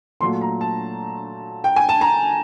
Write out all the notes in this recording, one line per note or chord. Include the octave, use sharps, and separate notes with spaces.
A#2 F#3 A3 C6
A#5
A5
G5
G#5
A5
A#5